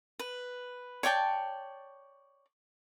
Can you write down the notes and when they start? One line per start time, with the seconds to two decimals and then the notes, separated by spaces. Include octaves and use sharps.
0.19 B4
1.03 C#5 D5 G5 A5